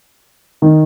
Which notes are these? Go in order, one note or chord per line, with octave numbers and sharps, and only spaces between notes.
D#3